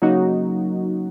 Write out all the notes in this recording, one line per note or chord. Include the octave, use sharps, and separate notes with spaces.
C#3 F#3 A#3 D#4 F#4